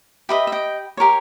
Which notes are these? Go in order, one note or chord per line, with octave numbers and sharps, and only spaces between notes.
G4 B4 D#5 E5
E5
D#5 G5
G4 A#4 C#5